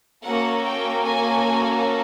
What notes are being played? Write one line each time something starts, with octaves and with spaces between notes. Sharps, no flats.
A#3 C#4 F#4 A4 F#5
G5
G#5